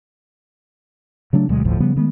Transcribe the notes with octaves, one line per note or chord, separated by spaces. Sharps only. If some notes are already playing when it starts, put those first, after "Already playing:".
C#3 F#3 A3 D4
D2 B2 F#3 G#3
G1 D2 A2 F3
C#3 F3 G3 B3
D#3 G#3 A3 B3